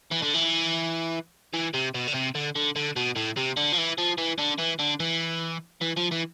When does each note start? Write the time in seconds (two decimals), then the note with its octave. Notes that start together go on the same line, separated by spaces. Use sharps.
0.11 E3
0.22 D3
0.34 E3
1.53 E3
1.74 C3
1.94 B2
2.07 D3
2.14 C3
2.35 D3
2.55 D3
2.76 D3
2.96 B2
3.16 A2
3.37 C3
3.57 D3
3.73 F3
3.78 E3
3.98 F3
4.18 E3
4.39 D3
4.59 E3
4.79 D3
5.00 E3
5.81 E3
5.97 F3
6.11 E3